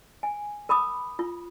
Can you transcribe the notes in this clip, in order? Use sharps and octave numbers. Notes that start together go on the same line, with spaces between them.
G#5
A#4 B5 D6 D#6
F4